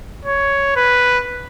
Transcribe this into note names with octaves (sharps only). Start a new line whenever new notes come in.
C#5
B4